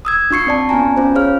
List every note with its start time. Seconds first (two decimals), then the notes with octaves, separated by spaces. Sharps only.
0.05 D#6 E6 G#6
0.30 D4 F4 C#6 C7 C#7
0.47 C4 D5 A5
0.69 B3 C#4 F4 G#5 A#5
0.97 C#4 F4 C5
1.15 G#4 C5 C#5 F5 F6